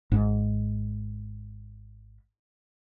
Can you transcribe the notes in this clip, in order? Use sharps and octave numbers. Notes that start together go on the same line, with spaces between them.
G#1 G#2